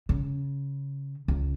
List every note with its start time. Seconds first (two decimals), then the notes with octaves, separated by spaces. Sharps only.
0.09 C#3
1.28 C#2